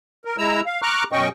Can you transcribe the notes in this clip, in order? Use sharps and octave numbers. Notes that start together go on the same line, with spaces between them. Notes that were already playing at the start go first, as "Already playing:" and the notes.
A#4
G#3 E4 A#5 E6
F5
A#5 C#6 D6 F6 F#6
F#2 B2 C#4 D#5 G5 C#6